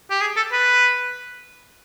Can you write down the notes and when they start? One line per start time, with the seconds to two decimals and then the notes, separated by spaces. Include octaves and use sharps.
0.10 G4
0.21 G#4
0.36 A4
0.52 B4